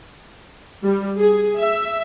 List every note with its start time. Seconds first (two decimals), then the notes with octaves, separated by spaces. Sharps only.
0.83 G3
1.18 G#4
1.58 E5